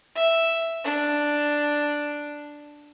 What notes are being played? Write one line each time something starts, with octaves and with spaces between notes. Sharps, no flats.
E5
D4